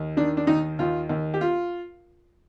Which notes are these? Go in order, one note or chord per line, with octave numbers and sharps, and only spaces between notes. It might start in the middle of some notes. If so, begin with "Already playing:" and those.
Already playing: D#2
D#3 D4
D4
D#2 D#4
D#2 F4
D#2
G4
F4